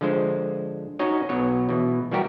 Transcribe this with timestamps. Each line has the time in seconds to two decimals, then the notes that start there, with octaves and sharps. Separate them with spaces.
0.01 D3 F3 G#3 C5
0.99 C#4 D#4 F#4 C#5 D#5
1.29 B1 B2 F#3 C#5
1.69 B2 E3
2.11 E3 G3 F#4 G4 A#4